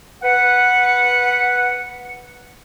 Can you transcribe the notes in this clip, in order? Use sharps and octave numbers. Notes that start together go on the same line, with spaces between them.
B4 F#5